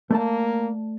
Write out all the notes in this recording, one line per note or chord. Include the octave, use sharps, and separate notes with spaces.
A3 A#3 D5 A5